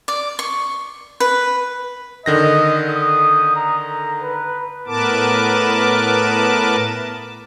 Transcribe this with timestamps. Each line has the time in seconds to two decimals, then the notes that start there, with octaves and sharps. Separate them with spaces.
0.08 D5
0.39 C#6
1.20 B4
2.26 D3 D#3 D#5 A#6
2.88 D#6
3.56 A#5
4.22 B4
4.87 A2 B3 A#4 B4 A5 D6